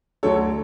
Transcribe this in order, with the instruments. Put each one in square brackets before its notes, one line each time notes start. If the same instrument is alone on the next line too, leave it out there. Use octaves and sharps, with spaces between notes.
[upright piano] D2 D3 F#3 A4 C#5